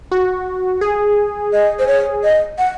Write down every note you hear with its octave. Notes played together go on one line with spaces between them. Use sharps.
F#4
G#4
D#5
C5
C#5
D#5
F#5